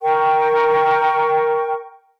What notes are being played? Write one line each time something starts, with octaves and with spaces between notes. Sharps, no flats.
A#4 G5 C#6